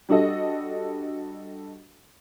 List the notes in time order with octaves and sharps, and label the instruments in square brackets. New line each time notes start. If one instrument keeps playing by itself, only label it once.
[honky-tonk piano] G3 D4 F#4 A4 D#5